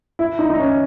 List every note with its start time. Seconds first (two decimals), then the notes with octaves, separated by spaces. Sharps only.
0.19 E4
0.39 D#4
0.50 D#4
0.60 C#4